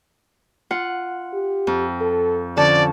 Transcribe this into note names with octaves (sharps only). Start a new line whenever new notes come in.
F4 F#5
G4
F2
A4
D3 F3 C#4 D5 A5